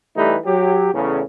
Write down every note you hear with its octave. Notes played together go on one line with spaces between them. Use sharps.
E3 G3 A3 D#4 G4 B4
F#3 G4
E2 A2 C#3